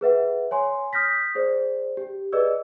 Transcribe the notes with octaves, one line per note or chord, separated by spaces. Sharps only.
G#4 B4 E5 F#5
C#5 G#5 C6
D#6 F6 G6 A#6 B6
G#4 C5 D5
G4
G#4 B4 D5 D#5 E6